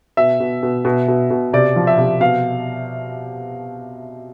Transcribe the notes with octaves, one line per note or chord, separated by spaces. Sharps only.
B2 E5
B2
B2
B2
B2
B2
C3 D5
F3
E5
C3
B2 F5